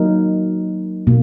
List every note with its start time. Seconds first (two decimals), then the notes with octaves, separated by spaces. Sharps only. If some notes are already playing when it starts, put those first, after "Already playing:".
Already playing: F#3 A#3 D#4 A#4
1.07 B2 A#3